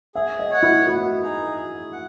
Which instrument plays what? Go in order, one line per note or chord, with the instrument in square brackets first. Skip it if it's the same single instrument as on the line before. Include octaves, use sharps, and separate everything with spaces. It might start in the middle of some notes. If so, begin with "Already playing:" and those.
[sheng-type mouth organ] G#4 [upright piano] E5
[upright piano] D#5
[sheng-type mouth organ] C#5 F#5
[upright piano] E4
[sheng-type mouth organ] B3 [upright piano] F#4
[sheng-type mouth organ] D#4 G#4
G#4
F#5